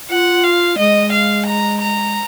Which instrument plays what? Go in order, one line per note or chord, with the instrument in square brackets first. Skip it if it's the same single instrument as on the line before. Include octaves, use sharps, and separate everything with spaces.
[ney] F4 [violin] F#5
[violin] F5
[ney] G#3 [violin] D#5
[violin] F5
A#5
A#5